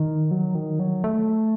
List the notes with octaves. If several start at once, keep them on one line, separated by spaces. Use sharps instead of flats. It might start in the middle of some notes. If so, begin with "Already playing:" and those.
Already playing: D#3
F#3
D#3
F#3
A3